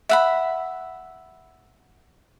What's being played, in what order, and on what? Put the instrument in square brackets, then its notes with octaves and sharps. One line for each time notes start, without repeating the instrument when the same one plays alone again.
[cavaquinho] E5 F#5 B5